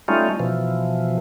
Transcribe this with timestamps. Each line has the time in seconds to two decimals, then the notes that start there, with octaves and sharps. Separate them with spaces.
0.08 G3 A3 C#4 D#4 F4
0.40 B2 E3 F3